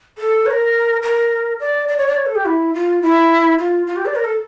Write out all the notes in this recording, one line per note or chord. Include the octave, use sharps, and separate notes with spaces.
A4
C#5
A#4
A#4
D5
D5
C#5
D5
C#5
A4
G4
E4
F4
E4
F4
F4
G4
D5
A#4
A4